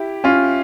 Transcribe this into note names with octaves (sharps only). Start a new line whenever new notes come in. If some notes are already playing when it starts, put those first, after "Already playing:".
Already playing: E4 G4
C#4 F4